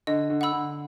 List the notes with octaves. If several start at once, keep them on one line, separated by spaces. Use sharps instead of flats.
D3 D#5
D3
F#5 B5 E6
D3